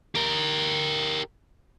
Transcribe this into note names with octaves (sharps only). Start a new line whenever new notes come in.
G4 A#4